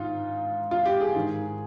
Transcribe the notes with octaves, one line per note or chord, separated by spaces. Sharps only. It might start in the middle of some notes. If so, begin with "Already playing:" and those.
Already playing: G#2 D#3 D#4 F4
F4
G4
G#4
G#2 D#3